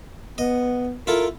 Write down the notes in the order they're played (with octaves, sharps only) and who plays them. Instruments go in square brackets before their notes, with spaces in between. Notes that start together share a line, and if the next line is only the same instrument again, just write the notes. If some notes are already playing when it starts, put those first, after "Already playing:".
[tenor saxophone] B3 [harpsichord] D#5
[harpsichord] E4 F4 A4 [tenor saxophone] A#4